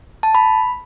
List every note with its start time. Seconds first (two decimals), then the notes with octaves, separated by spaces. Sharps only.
0.23 A5
0.35 B5